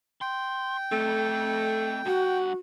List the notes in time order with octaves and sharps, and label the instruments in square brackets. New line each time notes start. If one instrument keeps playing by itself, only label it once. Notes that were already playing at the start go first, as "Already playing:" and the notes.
[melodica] G5 [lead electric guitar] C6
[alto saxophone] A3 [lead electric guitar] C4 A4
[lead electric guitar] G2 F#5 [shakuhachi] F#4